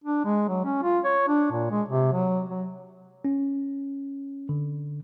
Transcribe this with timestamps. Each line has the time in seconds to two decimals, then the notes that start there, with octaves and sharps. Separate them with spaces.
0.04 D4
0.25 G#3
0.49 F#3
0.65 C#4
0.83 F4
1.04 C#5
1.28 D4
1.52 A#2
1.71 G#3
1.89 C3
2.13 F#3
2.49 F#3
3.25 C#4
4.49 D3